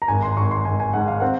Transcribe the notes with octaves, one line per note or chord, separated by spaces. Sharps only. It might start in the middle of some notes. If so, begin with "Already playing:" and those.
A#5
G#1 G#5
C6
G#1 C#6
C6
G#1 G#5
G#5
G#2 F#5
F5
C4 F#5